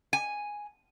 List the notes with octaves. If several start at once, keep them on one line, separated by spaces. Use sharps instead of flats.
G#5